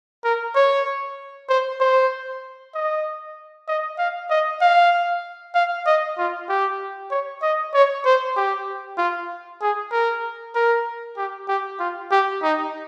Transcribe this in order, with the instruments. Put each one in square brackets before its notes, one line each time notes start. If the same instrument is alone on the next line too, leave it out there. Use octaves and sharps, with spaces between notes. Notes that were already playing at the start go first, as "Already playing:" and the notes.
[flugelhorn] A#4
C#5
C5
C5
D#5
D#5
F5
D#5
F5
F5
D#5
F4
G4
C#5
D#5
C#5
C5
G4
F4
G#4
A#4
A#4
G4
G4
F4
G4
D#4